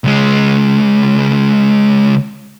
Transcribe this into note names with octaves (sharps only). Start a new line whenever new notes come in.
C#2 G#3